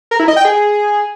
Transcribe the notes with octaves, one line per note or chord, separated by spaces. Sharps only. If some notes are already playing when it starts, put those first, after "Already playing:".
A#4
E4
D#5
G5
G#4